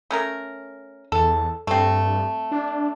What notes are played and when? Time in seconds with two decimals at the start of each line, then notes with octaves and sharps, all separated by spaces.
0.11 A3 C#4 A#4
1.12 E2 A4
1.67 G2 A3 C4
2.52 D4